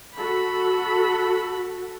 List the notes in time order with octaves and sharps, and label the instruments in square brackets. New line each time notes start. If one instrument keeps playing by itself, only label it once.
[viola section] F#4 A4 [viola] B5